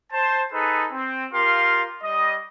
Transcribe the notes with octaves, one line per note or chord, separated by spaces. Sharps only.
C5 A5
D#4 G#4 A4 B4
C4
F4 G4 A#4 F5 C6
G3 D#5